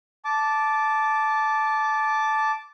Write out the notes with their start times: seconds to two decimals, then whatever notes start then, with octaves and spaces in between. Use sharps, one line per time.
0.25 A5 D6